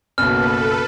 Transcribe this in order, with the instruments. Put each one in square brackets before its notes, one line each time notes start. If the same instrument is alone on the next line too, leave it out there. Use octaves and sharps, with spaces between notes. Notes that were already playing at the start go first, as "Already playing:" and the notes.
[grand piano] F#1 B1 [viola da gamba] A#3 B3 F#4 [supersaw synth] A4 B4 [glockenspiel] F6